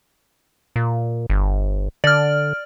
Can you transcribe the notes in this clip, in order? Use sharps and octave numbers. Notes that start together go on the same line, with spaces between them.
A#2
G1
D3 D5 F6